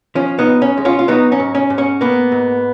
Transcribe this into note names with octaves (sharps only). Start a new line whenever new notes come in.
F3 C#4
B3 D#4
C#2
C#4
G#3
C#4 F4
F4
F#3 B3 D#4
C#4
G#2
C#4
G#2
C#4
A#3 B3
G#2